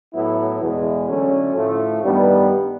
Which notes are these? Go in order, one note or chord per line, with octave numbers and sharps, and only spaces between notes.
A2 F#3 B3 E4
E2 B2 G#3
D3 F#3 A3 C#4
A2 F3 A3
G2 D#3 G3 B3 D4